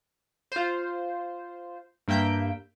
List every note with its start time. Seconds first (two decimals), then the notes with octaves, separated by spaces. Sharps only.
0.52 F4 C5
2.08 G2 A#3 E5 G5 G6